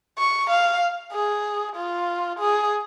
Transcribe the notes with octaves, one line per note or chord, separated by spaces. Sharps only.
C#6
F5
G#4
F4
G#4